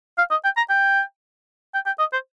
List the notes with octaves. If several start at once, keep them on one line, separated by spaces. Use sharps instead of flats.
F5
D#5
G5
A#5
G5
G5
G5
D#5
C5